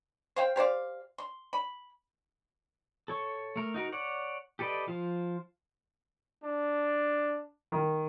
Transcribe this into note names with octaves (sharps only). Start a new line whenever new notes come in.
C5 F5 G5
G4 C5 D5 F5
C6
B5
A4 C#5 C#6
A3 A#4
D#4 F#4 A#4
C#5 D5 F#5
G4 A4 B4 D5 D#5
F3 F4 C5
D4
D#3